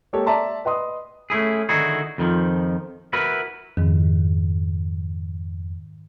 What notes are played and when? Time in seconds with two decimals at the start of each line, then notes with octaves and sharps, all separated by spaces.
0.13 G#3 A#3 G4 A4 C#5
0.26 D5 E5 A5 A#5 C6
0.65 B4 D#5 C6 D#6
1.30 A3 C#4 E4 G#4
1.69 D3 D#3 D#4 E4 F#4 G#4
2.18 F2 D#3 F3
3.13 E4 F#4 A#4 B4
3.77 F2 G#2 D#3